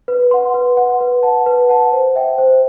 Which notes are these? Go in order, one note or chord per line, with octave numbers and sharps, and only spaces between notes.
B4
F#5 C6
B4
F#5 C6
B4
F#5 A5
B4
F#5 A5
C5
E5 G5
C5